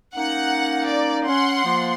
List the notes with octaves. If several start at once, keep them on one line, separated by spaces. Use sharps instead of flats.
A#3 C#4 D#4 F#5
D5
C#4 F#5 C6
F3 A#3